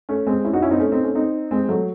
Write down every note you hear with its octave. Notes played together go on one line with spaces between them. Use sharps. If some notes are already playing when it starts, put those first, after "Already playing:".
A3 C#4
G#3 C4
C#4 E4
D#4 F#4
C#4 E4
C4 D#4
A3 C#4
C4 D#4
A3 C#4
C4 D#4
G#3 C4
F#3 A3